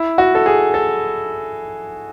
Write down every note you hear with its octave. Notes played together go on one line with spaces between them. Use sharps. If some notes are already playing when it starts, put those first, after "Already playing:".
Already playing: E4
F#4
A4
G#4
A4